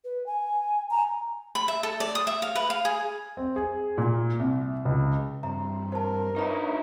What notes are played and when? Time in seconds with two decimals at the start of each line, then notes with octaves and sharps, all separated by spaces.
0.05 B4
0.26 G#5
0.91 G#5 A#5
1.55 B5
1.68 E5
1.83 A4
2.00 D5
2.15 D#6
2.27 E5
2.42 F5
2.55 B4
2.70 F5
2.85 G#4
3.37 C4
3.56 G#4
3.98 A#2
4.40 C2
4.85 C#2
5.43 G2 C4 E5 A#5
5.92 A#4 C5 A5
6.36 D#4 E4 B4 C#5 D#5 A#5 B5